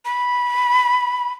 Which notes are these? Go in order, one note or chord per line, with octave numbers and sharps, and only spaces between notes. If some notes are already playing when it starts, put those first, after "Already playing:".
B5